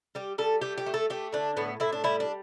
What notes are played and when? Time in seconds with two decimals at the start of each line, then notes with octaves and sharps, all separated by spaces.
0.15 G3 G4
0.38 G3 A4
0.61 A3 G4
0.78 G4
0.86 A3
0.94 A4
1.10 A3 G4
1.32 D3 D4
1.57 A2 B3
1.80 A2 E4
1.93 D4
2.04 G3 E4
2.20 D4